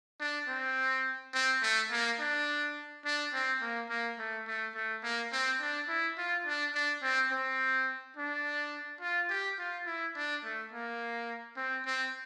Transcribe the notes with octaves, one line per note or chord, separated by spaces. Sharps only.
D4
C4
C4
A3
A#3
D4
D4
C4
A#3
A#3
A3
A3
A3
A#3
C4
D4
E4
F4
D4
D4
C4
C4
D4
F4
G4
F4
E4
D4
A3
A#3
C4
C4